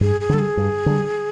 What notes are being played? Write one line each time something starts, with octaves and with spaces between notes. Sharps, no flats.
G2 G#4
G#4
D3 G3 A4
G#4
G2
D3 G3